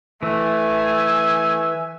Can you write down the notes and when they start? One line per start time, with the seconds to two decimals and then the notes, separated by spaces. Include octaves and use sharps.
0.23 E3 A3 E5 G#5